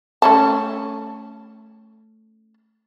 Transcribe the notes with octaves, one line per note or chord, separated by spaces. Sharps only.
A3 C#4 A5